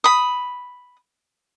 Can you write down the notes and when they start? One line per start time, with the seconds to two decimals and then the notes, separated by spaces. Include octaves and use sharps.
0.04 B5 D#6